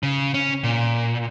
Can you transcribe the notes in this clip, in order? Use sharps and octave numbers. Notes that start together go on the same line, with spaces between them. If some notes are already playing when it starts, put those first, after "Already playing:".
C#3
C#4
A#2